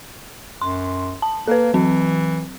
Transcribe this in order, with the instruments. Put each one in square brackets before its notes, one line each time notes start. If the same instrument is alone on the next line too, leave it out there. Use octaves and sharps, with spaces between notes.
[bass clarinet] F#2 [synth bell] C6
[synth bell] A5
[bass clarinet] A#3 [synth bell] A4 B4
[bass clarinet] E3 [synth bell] F#3 C4